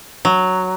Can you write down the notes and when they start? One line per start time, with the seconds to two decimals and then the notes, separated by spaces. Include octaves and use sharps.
0.25 F#3